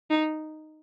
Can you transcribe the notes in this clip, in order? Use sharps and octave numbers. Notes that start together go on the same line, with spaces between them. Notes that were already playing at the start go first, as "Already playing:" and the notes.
D#4